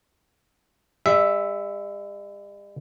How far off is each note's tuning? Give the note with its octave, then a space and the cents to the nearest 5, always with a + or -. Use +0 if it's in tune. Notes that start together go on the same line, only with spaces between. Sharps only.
G3 +45 E5 +0